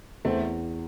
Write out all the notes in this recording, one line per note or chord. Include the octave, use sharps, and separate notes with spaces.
E2 A3 C4